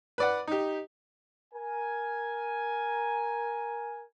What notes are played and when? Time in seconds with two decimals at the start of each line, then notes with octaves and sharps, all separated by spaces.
0.18 B4 D5 F#5
0.48 D#4 G4
1.54 A#4 G#5